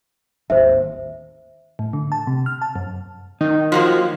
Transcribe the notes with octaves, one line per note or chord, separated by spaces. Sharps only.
D1 G#1 D#2 C5 E5
A2
D3
A5
C3
F6
A5
F#2
D#3 D#4
F3 F#3 A#3